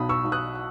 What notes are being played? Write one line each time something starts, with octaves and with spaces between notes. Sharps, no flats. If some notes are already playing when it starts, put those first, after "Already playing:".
Already playing: B1 B2 B5 D#6
C#6 E6
B1
D#6 F#6